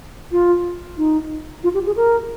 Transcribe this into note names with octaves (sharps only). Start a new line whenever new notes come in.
F4
D#4
F4
G4
G#4
A#4